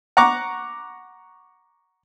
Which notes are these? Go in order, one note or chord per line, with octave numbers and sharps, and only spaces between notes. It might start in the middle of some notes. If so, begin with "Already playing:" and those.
F#5 A#5 C#6 D6